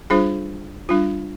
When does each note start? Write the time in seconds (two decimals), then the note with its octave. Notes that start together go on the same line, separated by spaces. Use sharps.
0.10 G3 D4 F4 G#4 C5
0.89 G3 D4 F4